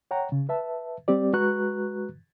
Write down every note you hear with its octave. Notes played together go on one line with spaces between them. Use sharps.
C#5 F#5 G5 A#5
C#3
B4 E5 A5
G3 C4 G4 D5
G#3 F#4 B4 A#5 C#6 F#6